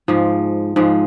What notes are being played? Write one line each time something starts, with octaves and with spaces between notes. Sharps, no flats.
G#2 F3 G#3
G#2 F3 G#3